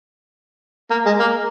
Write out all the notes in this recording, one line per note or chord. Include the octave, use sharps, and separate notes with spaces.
A#3
G#3
A#3